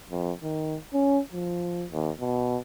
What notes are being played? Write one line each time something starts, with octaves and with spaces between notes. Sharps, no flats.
F2
D#3
C#4
F3
D#2
B2